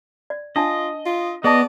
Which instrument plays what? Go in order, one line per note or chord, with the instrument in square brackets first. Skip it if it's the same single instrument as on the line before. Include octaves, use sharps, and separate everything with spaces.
[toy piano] D5
[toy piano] D4 G#5 A5 [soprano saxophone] F4 [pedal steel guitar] D#5
[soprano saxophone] F4
[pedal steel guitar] B3 [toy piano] G#4 A5 [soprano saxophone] D5 [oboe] D#5